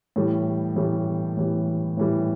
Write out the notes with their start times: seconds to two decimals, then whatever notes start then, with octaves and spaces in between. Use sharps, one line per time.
0.16 A2 E3 G3
0.76 A2 E3 G3
1.37 A2 E3 G3
1.97 A2 E3 G3